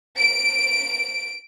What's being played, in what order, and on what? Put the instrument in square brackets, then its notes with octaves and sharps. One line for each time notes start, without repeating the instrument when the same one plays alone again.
[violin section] D7